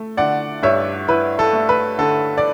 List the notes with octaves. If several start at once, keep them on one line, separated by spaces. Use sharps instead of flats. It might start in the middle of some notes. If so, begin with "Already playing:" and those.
Already playing: A3
D3 D5 F#5
G2 C#5 E5
E4 B4
A4
A3
B4
D3 A4
D5